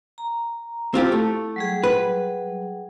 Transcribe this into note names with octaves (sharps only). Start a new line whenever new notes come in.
A#5
C4 E4 F4 G4
A3
F#3 G3 G#4
B4